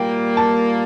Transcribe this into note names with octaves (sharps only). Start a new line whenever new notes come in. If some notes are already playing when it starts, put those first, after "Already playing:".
Already playing: A#2 G3 A#3 G5
A5